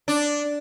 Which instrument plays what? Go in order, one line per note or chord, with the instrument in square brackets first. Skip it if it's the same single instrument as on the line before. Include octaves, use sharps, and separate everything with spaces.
[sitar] D4